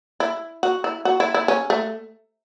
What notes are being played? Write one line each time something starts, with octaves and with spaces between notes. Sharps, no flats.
E4
F#4
E4
F#4
E4
E4
C#4
A3